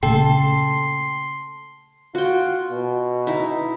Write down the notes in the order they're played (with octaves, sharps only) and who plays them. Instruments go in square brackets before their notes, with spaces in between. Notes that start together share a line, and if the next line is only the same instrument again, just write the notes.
[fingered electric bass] A#2 C#3 A3 [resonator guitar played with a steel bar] A4 [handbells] G5 [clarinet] C6
[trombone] F4 [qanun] F#4 G5
[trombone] B2
[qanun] D#4 E4